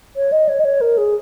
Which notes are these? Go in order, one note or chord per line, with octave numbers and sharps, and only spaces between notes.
C#5
D#5
C#5
D#5
C#5
A#4
G#4